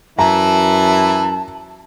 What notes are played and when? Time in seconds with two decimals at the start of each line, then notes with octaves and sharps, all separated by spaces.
0.19 F#2 E3 E4 A5 A#5